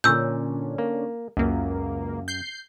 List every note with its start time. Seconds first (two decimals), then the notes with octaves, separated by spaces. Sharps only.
0.04 A#2 D3 C#4 D4 E6 G6
0.78 A#3
1.37 C#2 F#2 A#3
2.28 G6 C7